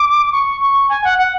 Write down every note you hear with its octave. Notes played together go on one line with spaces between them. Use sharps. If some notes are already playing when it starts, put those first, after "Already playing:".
Already playing: D6
C#6
C#6
G#5
F#5
F#5